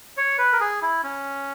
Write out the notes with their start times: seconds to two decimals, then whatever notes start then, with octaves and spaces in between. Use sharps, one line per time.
0.17 C#5
0.38 B4
0.53 A#4
0.60 G#4
0.82 E4
1.03 C#4